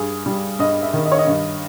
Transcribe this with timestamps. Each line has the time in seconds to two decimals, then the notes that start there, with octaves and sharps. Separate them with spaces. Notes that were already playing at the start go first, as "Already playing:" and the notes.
Already playing: G2 G#4
0.26 G3
0.59 G2 D#5
0.82 E5
0.93 D#3
1.05 D#5
1.12 C#5
1.19 D#5
1.27 G2